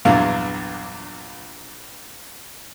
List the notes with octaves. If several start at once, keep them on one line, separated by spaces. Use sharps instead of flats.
A#1 E2 G2 F#3 F4 F5